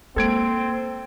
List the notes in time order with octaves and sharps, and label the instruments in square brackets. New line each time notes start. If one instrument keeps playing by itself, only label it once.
[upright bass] G#3 A#3 [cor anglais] C4 [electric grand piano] A4 G#6 D7